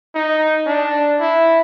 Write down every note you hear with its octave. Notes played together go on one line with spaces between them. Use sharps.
D#4
D4
E4